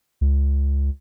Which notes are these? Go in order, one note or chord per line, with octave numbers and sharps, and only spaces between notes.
C#2